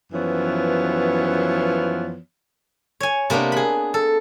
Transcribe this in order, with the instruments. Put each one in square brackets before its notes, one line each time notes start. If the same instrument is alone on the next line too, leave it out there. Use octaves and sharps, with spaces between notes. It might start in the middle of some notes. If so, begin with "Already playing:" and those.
[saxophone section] F#2 E3 F3 B3 C#5
[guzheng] C#5 G#5
C3 A#3 B3 D4
G#4 B5
A4